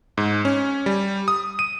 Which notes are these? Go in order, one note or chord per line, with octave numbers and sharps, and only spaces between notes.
G#2
C#4
G3
D#6
D#7